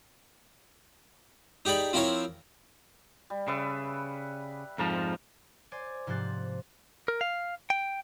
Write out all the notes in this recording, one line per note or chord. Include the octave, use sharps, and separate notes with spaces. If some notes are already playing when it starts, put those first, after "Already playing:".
D#4 G4 G#4 D5 B5
F3 C4 E4 F4 A#4 C#5
G3
C#3 B4 D5 E5
F2 G#2 F3 A#4 A5
C5 D5 G#5
G#2 C3 F3 C5 F#6 A6
A#4
F5
G5